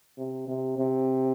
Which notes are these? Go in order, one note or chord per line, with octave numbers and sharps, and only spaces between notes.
C3
C3
C3